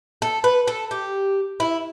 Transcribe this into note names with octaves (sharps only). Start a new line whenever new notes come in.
A4
B4
A4
G4
E4